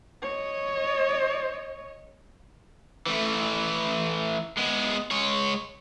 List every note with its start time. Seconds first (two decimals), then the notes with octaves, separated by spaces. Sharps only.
0.22 C#5 D#5
3.07 E3 A3
4.57 G#3 B3
5.11 G#3 C#5